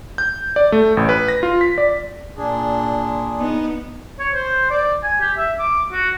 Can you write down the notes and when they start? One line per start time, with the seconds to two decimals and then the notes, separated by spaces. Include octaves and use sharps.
0.18 G6
0.56 D5
0.72 A3
0.97 A1
1.09 B4
1.28 A#6
1.43 F4
1.61 B6
1.78 D5
2.37 A#2 D4 G#4
3.40 B3 D#4
4.20 C#5
4.35 C5
4.70 D5
5.03 G#5
5.21 G4
5.37 E5
5.59 D6
5.92 F#4